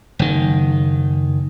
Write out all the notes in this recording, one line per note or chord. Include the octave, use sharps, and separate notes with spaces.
F#1 D#3